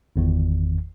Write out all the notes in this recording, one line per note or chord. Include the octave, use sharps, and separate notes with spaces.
G1 E2 D#3